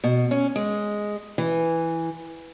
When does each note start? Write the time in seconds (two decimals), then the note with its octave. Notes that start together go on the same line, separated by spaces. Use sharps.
0.04 B2
0.31 C#4
0.56 G#3
1.38 E3